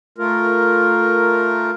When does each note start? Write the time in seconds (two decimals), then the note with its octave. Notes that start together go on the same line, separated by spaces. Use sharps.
0.18 A3 F4 A#4